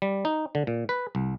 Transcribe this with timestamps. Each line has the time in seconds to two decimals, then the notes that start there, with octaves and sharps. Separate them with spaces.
0.02 G3
0.25 D#4
0.55 D3
0.67 A#2
0.89 B4
1.15 C2